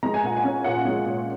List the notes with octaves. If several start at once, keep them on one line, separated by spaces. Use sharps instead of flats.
G#3 A#5
G#5
A#2 F#5
G#5
C#4
A#2 F#5
G#3
A#2